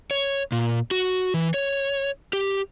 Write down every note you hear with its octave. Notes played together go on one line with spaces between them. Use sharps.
C#5
A#2
F#4
E3
C#5
G4